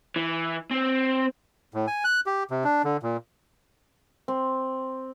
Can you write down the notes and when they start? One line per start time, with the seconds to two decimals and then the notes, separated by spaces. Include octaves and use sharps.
0.16 E3
0.71 C4
1.74 A2
1.87 G#5
2.04 F#6
2.26 G4
2.51 C3
2.64 D4
2.84 D3
3.03 A#2
4.28 C4